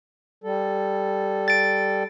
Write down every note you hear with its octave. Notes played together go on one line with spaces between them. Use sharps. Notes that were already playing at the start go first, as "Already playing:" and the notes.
G3 A4
A6 D7